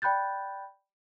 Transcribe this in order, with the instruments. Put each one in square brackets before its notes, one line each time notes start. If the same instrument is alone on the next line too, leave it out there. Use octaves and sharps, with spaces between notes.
[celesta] D5 G5 B5 F#6 G6 A6